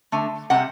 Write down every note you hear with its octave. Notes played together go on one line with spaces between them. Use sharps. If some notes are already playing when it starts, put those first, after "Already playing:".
D3 A3
C3 G3 F#5